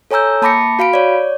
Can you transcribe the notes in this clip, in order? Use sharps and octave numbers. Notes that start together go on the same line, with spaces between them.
A4 C#5 G#5 A#5 E6 G6
A#3 A5 B5 D6 A#6 C#7
F#4 F5 B5 D7
C#5 D5